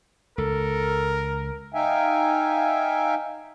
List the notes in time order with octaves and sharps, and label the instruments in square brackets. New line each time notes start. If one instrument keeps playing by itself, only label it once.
[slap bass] C#2 [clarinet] A4 [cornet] A#4
[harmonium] D#4 E5 F5 G5 G#5